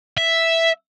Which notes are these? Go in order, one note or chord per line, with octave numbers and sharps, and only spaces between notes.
E5